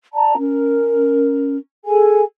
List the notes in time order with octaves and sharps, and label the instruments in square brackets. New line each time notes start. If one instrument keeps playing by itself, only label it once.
[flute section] D5 A5 A#5
C#4 A#4
G#4 A4 G#5